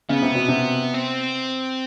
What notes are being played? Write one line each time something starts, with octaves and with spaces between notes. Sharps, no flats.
C#3 B3
C3
B2
C3
C4